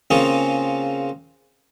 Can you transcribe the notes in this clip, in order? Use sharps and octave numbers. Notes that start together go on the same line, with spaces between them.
C#3 A#3 C4 C#4 F4 G#4